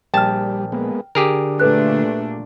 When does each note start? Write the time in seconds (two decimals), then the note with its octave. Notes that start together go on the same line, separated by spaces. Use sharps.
0.14 A#1 G3 G5 A5 F6
0.72 G#3 A#3 B3
1.15 D3 G4 G#4 A#4
1.60 A#2 A3 D4 A4 B4 F#6